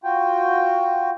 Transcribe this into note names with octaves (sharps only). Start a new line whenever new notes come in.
F4 F#4 G5